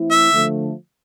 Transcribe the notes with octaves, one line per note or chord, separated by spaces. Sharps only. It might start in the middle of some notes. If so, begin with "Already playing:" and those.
Already playing: E3 A3 C4 E4
E5
D3 F3 A3